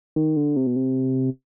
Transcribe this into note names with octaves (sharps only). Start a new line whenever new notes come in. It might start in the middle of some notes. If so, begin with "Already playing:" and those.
D#3
D3
C3
B2
C3